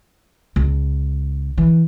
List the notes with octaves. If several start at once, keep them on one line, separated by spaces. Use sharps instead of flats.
C#2
E3